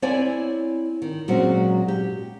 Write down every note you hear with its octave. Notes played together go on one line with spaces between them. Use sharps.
C4 E4 C#5 D5 G#5
D#3
A#2 F#3 G#3 C4 C#4 F#4
G4